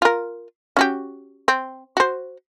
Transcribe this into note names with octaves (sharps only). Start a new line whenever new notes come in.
F4 A#4
C#4 F#4 G4
C4
F#4 C5